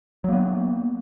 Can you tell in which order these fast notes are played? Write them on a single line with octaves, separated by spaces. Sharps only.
F#3 A#3 B3